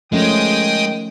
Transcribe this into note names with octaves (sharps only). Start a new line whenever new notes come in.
D#3 F3 G#3 A3 C#4 G5 D#6